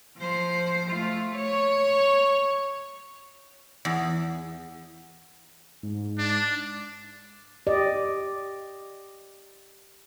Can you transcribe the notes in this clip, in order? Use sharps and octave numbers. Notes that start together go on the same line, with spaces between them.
F3 C5
A3 F4
C#5
E2
G#2
D4
G4 D5 D#5